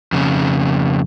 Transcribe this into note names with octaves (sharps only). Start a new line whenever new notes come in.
F2 C#3